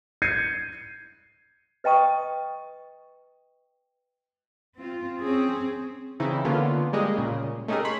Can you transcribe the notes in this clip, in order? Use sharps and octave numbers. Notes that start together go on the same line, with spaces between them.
G6 G#6 C7 C#7 D#7
B4 D#5 G5 A5 C#6 D#6
C4 F4
C4 C#4 G#4
C#3 E3 C4 D#4 E4
D3 A#3 B3 C#4 F4
G3 G#3 A#3 G4 G#4 D#5
A#2 C#3
A3 C#4 D#4 G4 G#4 A#4
C#5 B5 C6